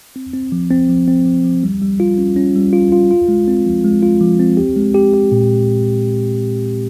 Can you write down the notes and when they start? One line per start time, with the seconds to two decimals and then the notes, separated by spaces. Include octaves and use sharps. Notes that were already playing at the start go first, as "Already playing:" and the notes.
0.16 C4
0.33 C4
0.52 F3
0.70 C4
0.89 F3
1.07 C4
1.26 F3
1.44 F3
1.63 G3
1.82 G3
2.00 F4
2.18 C#4
2.36 C#4
2.56 G3
2.73 F4
2.92 F4
3.11 F4
3.28 G#3
3.48 C4
3.66 F3
3.84 G#3
4.03 F4
4.21 F3
4.39 C4
4.57 G4
4.76 G#3
4.94 G4
5.14 G4
5.32 A#2